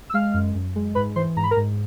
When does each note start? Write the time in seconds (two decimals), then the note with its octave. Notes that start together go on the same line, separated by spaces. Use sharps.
0.10 E6
0.14 G#3 F5 F6
0.34 F#2
0.55 F#2
0.76 G#3
0.95 G#2 B4 B5
1.16 E3 C5 C6
1.36 G#2 A#5
1.43 B5
1.51 A#4 A#5
1.57 G#2